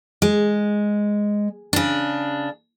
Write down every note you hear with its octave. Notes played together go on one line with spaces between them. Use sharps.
G#3
C#3 D4